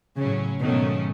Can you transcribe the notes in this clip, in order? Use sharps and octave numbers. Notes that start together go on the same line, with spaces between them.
A2 C#3 F#3 C#4
G#2 B2 D#3 F#3 A3 C#4